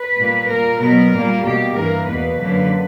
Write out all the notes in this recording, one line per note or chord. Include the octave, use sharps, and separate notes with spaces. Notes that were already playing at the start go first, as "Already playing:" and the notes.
Already playing: B4
A#2 G3 A#3
A#2 A#3 A#4
B2 F#3 B3 A#4
A#2 G3 A#3
B2 A#3 G4
G2 E3 A#3 A#4
E2 B2 A#3 B4
F#2 D3 A#3